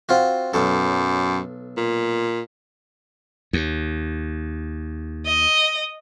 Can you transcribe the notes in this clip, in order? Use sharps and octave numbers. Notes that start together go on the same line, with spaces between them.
C4 F4 F#4
B1 F#2 A4
A#2
D#2
D#5